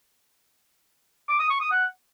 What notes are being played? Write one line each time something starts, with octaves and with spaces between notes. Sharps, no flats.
D6
D#6
C#6
D#6
F#5